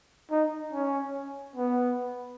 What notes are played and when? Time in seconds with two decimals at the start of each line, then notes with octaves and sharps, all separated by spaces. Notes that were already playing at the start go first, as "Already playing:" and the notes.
0.31 D#4
0.73 C#4
1.56 B3